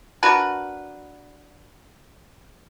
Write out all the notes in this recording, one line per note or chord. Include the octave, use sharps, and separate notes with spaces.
D4 F#4 A#4 B4